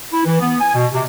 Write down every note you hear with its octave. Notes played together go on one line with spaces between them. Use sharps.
E4
E3
B3
G#5
B2
C3